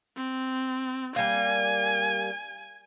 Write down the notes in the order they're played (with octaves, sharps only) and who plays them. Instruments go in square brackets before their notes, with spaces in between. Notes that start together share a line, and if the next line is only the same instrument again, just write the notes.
[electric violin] C4
[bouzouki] G3 A#3 [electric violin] G#5